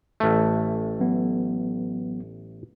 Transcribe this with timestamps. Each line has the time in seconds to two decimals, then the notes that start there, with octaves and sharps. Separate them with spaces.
0.20 A1 A3
1.00 F#3 B3